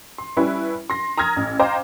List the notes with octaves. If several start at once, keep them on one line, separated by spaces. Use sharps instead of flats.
C6
G3 C#4 E4 B4
C6 A#6
A#5 D#6 F6 G#6 A#6
A1
C5 D#5 F5 G5 A#5 D6